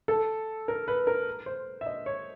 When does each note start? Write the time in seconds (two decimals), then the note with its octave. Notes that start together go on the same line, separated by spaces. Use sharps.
0.08 A4
0.68 A#4
0.88 B4
1.07 A#4
1.46 C5
1.81 E5
1.86 D#5
2.06 C#5